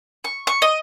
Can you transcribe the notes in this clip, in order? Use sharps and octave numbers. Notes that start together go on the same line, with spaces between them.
C#6
C#6
D#5